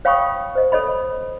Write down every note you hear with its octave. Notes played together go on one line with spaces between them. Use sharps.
C#5 F5 G5 B5 C#6 D#6
C5 D#5
A4 C#5 D#5 B5